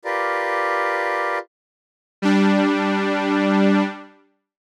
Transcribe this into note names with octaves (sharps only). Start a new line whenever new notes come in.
F4 G4 A#4 B4 D5
G3 D4